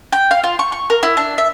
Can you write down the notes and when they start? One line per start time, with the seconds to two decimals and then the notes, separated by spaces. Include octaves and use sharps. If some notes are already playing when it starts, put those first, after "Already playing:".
0.12 G5
0.31 F5
0.44 F4
0.59 C#6
0.72 C#6
0.90 A#4
1.03 E4
1.17 D4
1.38 E5